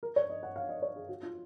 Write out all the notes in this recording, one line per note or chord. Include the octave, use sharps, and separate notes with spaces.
A#4
C#5
D#5
F#5
F5
D#5
C#5
G#4
F#4
F4